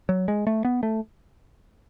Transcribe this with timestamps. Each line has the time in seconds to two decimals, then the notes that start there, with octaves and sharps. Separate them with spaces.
0.09 F#3
0.28 G#3
0.47 A3
0.65 B3
0.83 A3